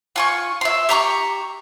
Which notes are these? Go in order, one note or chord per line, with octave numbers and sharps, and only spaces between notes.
F4 G#5 C#6
E5 C6
G4 A#5 B5 C#6